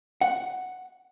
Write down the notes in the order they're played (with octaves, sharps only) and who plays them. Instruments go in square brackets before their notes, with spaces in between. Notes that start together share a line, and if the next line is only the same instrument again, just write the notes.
[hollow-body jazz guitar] F#5